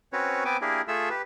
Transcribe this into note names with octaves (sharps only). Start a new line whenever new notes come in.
C4 C#4 F#4 B4 C#5
B3 C4 B4 G5 G#5 D6
A#3 D4 E4 G4 G#4 A#4
A3 F4 G#4 A4 E5 E6
G4 B4